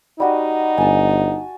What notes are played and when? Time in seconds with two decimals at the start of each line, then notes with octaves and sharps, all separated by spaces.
0.20 G3 D#4 F#4 D#5
0.78 G1 G#5 A5